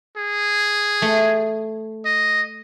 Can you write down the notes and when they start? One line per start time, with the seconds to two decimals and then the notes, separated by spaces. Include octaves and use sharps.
0.17 G#4
1.02 A3
2.05 D#5